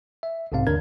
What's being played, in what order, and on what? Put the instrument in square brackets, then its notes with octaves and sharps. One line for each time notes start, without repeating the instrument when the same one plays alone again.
[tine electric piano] E5
B1 G#2 C3 C4 F5
D#2 D3 D4 A#4 G#6